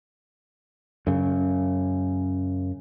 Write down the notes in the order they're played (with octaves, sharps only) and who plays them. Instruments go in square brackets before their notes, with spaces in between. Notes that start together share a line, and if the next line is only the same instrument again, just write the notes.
[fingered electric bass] F#2 C#3